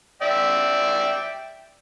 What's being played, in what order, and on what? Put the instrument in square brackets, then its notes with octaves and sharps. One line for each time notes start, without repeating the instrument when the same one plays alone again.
[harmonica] D5 E5 G5